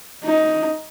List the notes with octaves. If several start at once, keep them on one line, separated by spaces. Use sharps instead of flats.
D#4